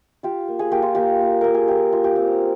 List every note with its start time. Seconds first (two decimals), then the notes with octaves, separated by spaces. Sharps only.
0.23 F4 G4
0.48 A#3
0.59 G#4
0.71 A#3 G4
0.82 F4
0.95 A#3 G4
1.20 A#3
1.41 A#3 A#4
1.54 G#4
1.68 F4 G4
1.92 F4
2.04 G4
2.16 C4